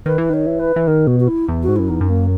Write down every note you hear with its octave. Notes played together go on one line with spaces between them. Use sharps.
D#3 B4
E3
D#3 C#5
E3
B4
E3
D#3 A#4
B2 F#4
F#4
E4
E2
F#4
G#2
F#2 E4
E2 D#4
F#2
A#3